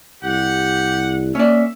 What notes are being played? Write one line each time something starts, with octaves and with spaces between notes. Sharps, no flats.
C2 G4 F#5
A#3 C#4 D5 E5